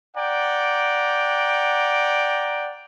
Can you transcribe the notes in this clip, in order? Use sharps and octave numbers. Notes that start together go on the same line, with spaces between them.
D5 F#5 G5 A#5